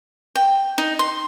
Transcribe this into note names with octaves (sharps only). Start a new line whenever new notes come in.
G5
D#4
C6